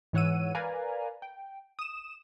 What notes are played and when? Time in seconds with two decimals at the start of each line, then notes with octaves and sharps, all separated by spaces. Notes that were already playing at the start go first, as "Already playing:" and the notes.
0.13 G#2 E3 C#5 F#5 E6 D#7
0.55 A#4 B4 D5 F5 G#5 A#5
1.22 G5
1.79 D#6 E7